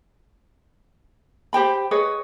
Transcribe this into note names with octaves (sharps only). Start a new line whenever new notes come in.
G4 C5 G5 B5
G#4 B4 C#5 D#5